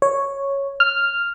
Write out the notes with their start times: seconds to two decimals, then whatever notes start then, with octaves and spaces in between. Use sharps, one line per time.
0.02 C#5
0.80 F6